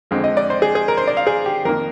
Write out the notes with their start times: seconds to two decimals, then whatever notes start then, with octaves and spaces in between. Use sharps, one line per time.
0.11 F2 D3 G#3 C4
0.24 D#5
0.37 D5
0.50 C5
0.62 G#4
0.75 G#4
0.88 A#4
0.97 C5
1.07 D5
1.17 F5
1.27 G#4
1.46 G4
1.65 F2 D#3 A#3 A#4